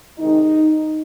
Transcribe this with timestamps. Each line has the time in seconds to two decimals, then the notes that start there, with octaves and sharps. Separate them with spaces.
0.19 C3 D#3 G#3 D#4